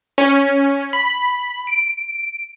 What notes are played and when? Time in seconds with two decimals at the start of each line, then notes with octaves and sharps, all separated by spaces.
0.18 C#4
0.93 B5
1.67 D7